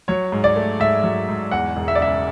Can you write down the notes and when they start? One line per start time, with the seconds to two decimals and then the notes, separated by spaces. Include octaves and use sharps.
0.08 F#3 C#5
0.32 G#2
0.44 D5
0.56 A3
0.80 G#2 E5
1.04 F#3
1.28 G#2
1.51 E2 F#5
1.76 E1
1.88 E5
1.95 D5
2.00 C#3 E5